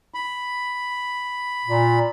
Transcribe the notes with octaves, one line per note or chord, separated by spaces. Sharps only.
B5
A#2